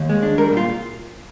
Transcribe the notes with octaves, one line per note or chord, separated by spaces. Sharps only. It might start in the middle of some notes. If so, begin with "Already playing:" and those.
Already playing: D#2
G#3
D4
G3 A#4
A#2 F4